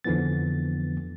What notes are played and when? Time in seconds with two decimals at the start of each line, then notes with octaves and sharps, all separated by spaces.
0.04 F2 D3 E3 F3 B3 A6